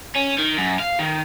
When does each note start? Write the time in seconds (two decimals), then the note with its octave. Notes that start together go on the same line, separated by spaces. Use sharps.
0.15 C#4
0.38 D#3
0.58 F#2
0.79 F5
0.99 D#3